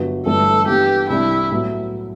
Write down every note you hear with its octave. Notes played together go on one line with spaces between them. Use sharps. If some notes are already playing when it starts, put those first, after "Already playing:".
Already playing: G1 G2 F#3 B3 F#4
G1 G2 E3 A3 D4 A4
G2 E3 B3 G4
C2 C3 G3 D4 E4 G4
A2 F#3 B3